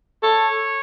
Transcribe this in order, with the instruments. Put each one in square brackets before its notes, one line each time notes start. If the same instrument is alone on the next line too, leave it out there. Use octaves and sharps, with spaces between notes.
[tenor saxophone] A4 [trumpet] C#5